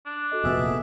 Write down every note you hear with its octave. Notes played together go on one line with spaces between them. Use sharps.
D4
F#4 A4 D#5
F1 A#2 B3 G#4 E5